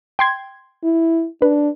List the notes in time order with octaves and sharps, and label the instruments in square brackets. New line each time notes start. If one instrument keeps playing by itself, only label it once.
[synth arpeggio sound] G5 C6 G#6
[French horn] E4
[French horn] D4 [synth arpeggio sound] B4